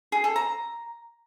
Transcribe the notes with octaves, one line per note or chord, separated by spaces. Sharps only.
G#4
A4
A#5